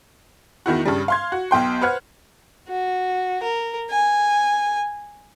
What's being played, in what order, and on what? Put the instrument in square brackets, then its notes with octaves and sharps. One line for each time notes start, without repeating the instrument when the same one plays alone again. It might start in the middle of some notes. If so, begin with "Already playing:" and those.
[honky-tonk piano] E2 D#3 E4 F#4
G2 C#3 G3
F5 C6 G#6
F#4
B1 B2 G5 C6
B4 C5 F#5 F6 F#6 G#6
[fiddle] F#4
A#4
G#5